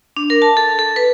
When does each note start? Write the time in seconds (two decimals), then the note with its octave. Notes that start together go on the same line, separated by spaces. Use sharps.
0.17 D4
0.30 A#4
0.42 A5
0.57 A4
0.79 A4
0.96 B4